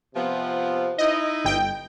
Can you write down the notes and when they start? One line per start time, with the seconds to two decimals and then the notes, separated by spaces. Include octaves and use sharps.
0.15 C3 F3 B3
0.98 D#4 E4 D#5
1.45 G1 G5